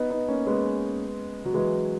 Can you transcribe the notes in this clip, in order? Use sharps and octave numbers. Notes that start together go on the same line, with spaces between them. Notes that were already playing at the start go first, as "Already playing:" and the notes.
Already playing: B3 D#4
B3 D#4
A#3 C#4
G#3 B3
F#3
E3 G#3